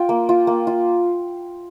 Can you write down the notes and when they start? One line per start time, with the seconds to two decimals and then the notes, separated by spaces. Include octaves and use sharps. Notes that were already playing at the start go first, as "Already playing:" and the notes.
Already playing: F4 G5
0.09 A#3
0.29 F4
0.47 A#3
0.67 F4